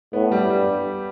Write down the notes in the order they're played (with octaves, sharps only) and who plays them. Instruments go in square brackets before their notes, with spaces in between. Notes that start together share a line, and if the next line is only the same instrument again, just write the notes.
[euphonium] A2 [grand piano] B3
[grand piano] G3
[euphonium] G2 [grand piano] G3